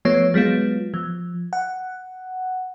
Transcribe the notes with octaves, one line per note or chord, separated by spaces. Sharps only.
F3 A3 B3 C#5
F#3 G#3 B3 F4
F3
F#5